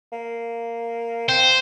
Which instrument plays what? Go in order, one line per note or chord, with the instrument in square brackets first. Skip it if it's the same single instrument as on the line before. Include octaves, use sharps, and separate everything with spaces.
[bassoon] A#3
[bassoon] C4 [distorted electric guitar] C5